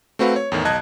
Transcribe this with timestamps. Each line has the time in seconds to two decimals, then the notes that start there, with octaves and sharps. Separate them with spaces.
0.19 A3 C4 F#4 B4 F5
0.36 C#5
0.52 E2 A2 D#3
0.65 B1 D#5 A5 F#6 G#6